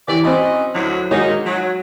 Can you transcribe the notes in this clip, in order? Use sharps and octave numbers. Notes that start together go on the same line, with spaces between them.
E3 G4 C#5 D5
C4 C#4 F#4 D#5 B5
D2 A2 F#3
D#3 G#3 A#3 D#4 F#4 C#5
F#3